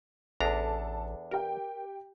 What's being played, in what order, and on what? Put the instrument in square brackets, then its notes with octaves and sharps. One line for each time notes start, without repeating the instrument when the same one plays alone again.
[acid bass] A1 [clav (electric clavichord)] E2 D4 A#5 [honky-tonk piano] A4 A5
[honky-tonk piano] G4 G5 [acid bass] A#4